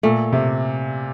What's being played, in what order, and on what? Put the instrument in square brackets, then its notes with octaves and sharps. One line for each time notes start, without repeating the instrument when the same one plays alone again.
[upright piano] A#2 [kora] A3
[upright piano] C3